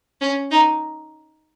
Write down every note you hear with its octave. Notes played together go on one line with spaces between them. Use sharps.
C#4
D#4